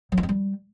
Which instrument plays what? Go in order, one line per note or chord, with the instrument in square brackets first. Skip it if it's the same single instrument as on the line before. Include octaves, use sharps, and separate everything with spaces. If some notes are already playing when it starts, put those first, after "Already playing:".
[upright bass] F#3
D#4
C4
G3